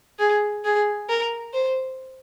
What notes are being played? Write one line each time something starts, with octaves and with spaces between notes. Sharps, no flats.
G#4
G#4
A#4
C5